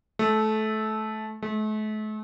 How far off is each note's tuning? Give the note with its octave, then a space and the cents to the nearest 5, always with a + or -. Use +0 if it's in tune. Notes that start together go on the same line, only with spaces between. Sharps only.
A3 -20
A3 -40